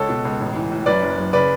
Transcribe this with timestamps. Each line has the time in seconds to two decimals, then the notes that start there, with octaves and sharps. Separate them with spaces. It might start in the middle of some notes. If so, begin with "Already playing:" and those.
Already playing: C#2 A4 C#5
0.09 B2
0.25 C#2
0.40 A1
0.56 E3
0.72 A2
0.86 F#2 B4 D5
1.02 F#1
1.17 F#1
1.33 C#3 B4 D5